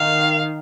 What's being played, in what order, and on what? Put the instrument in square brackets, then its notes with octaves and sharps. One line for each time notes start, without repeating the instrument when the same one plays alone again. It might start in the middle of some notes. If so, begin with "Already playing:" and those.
Already playing: [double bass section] D#3 [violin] F5